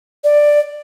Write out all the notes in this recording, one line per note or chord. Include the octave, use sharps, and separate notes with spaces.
D5